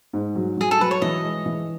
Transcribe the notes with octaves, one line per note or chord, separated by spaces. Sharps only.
G#2
F#3
F#3 G#4
A4
F#3 B4
C#5
E3 D#5
G#3
E3